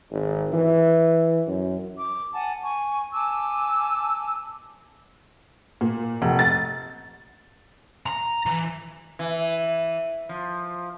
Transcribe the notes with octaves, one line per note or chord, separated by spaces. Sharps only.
G#1
E3
F#2
D6
F#5 G#5 A5
G#5 C#6
G#5 A5 D6 E6
A#2
F1
A6
A#5
E3
E3
F3